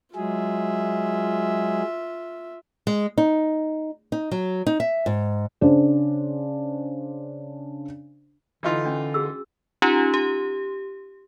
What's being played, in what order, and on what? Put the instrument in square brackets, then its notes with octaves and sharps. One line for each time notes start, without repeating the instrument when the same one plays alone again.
[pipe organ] F#3 G#3 G#4 [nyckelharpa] F4 E5
[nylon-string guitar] G#3
D#4
D#4
F#3
D#4
E5
G#2
[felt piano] C#3 D4 C5 D5
[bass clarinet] D3 [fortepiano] E3 D#4 F4
[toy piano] C#4 D4
F#4 G#4 E6
[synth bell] C#4 D#4 F4 G4
G4